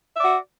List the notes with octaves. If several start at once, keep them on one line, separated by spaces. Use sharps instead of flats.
F#4 D5 E5